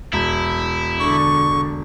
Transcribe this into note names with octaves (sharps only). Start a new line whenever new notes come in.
E1 E4
D3 C#6